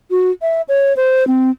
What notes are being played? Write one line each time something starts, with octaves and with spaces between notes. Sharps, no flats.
F#4
E5
C#5
C5
C4